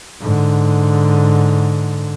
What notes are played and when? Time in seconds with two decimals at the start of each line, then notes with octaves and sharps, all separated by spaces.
0.22 G#2 D3